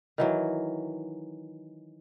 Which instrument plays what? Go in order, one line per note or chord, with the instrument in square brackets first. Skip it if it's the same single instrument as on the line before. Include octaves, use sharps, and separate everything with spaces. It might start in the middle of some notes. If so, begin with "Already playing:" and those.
[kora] D#3 E3 F#3